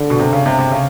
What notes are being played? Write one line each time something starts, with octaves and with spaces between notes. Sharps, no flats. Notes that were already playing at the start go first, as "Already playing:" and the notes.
Already playing: D3
B2
C3
C#3
C3
C3
C#3